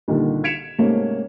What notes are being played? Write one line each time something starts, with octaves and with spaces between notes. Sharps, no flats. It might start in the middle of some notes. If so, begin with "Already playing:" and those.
C2 A#2 D3 D#3
G#6 B6 C#7 D7 E7 F7
G#2 C3 A3 A#3 C#4